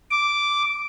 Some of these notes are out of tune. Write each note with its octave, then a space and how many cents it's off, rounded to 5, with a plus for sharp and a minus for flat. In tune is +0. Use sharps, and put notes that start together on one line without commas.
D6 -5